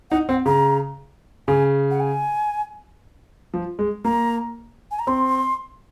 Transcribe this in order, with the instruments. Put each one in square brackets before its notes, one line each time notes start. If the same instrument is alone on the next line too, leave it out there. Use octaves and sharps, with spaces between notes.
[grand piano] D#4 [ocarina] F#5
[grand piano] C4 [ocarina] F#5
[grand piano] C#3 [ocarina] A#5
[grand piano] C#3 [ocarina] G#5
[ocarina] F#5
G#5
[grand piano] F3
G#3
[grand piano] A#3 [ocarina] A#5
[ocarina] G#5
A#5
[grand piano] C4 [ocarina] C6